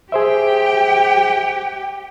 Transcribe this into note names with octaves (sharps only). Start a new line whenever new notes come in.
G4 G#4 C5 E5 G5